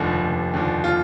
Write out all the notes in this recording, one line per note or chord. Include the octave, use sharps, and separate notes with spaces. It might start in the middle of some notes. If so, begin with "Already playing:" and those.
Already playing: F1 D#2 D3 F3
F1
D#2 D3 F3
F4